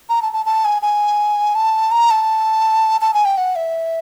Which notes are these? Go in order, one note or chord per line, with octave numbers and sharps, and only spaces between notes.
A#5
A5
A5
A5
G#5
G#5
A5
A#5
A5
A5
G#5
G5
F#5
E5